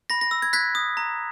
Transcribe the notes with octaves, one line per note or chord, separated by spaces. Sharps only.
B5 A#6
A#6
E6
G#6
F#6 G#6 B6
D#6
A#5